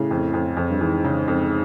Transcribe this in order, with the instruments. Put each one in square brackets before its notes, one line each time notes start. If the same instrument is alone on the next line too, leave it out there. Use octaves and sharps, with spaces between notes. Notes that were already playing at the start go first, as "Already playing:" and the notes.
Already playing: [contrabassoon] A2 [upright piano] C#3
[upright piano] F2
F2
F2
[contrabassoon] G2
[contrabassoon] G#2 [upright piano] E3
[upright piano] C#3
F2